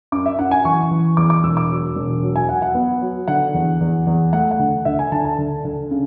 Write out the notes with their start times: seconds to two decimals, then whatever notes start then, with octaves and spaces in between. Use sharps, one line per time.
0.12 F#2 D6
0.26 E5
0.39 F#2 F#5
0.51 G#5
0.65 E3 C#6
0.91 E3
1.17 E2 D6
1.30 D6
1.44 E1 E6
1.57 D6
1.70 F#3
1.96 E1
2.23 F#3
2.36 G#5
2.49 F#3 F#5
2.62 F#5
2.75 B3
3.01 F#3
3.28 D3 F#5
3.54 E2
3.80 E2
4.07 E2
4.33 A3 F#5
4.51 F#5
4.59 D2
4.85 D2 E5
4.99 G#5
5.12 D3 A5
5.25 A5
5.38 D2
5.64 D2
5.91 C#3